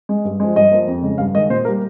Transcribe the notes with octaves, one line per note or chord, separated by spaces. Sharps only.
G#3
G2
F3 G#3
G2 D#5
F3 A#3
F2
C#3 G#3
G2 F5
D#3 G#3 D#5
A#2 C5
G3 A#3 A#4